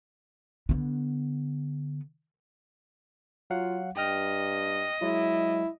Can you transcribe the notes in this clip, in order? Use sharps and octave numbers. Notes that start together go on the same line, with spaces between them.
D3 B3
F#3 F4 F5 F#5
G2 D#5 G5 F6
F#3 G#3 E4